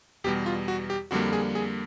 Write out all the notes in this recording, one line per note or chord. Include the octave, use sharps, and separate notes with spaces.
E2 B2 G3 G4
F4
F#4
G4
F2 D3 G3 A#3 F#4
G#4
G#4